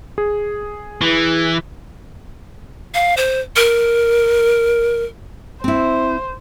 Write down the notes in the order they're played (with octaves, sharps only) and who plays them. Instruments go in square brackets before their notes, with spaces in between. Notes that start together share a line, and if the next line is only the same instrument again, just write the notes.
[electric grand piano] G#4
[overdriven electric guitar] E3
[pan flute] F5
C5
A#4
[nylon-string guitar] C4 E4 [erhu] C5